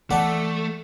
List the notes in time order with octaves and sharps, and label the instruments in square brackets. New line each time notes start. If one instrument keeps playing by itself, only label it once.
[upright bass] E3 [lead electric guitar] A3 [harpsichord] D5 A5 [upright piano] F#5